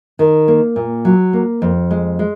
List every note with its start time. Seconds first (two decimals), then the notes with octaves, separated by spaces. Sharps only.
0.19 D#3
0.48 A#3
0.76 A#2
1.05 F#3
1.33 A#3
1.62 F2
1.91 G#3
2.19 G#3